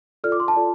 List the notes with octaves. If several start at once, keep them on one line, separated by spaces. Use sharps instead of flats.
F4 A4 D5 F6
D6
C6
A5
F4 A4 D5